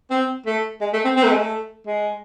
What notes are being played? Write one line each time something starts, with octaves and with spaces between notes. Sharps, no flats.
C4
A3
G#3
A3
C4
C4
A3
G#3
A3
G#3